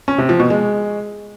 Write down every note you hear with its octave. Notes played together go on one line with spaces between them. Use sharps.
C#4
C3
F3
B2
G#3